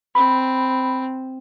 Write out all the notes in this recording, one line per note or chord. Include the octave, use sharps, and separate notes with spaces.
C4 B5